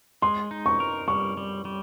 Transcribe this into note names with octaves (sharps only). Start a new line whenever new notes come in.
G#3 C6
D#4
C#6
A#4
G3 C#6
G3
G3